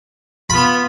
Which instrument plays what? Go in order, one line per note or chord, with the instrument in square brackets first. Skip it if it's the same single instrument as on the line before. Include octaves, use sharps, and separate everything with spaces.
[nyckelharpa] B3 F4 [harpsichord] B5